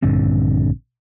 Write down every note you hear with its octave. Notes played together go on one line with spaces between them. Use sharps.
A#1 G2 D3 C4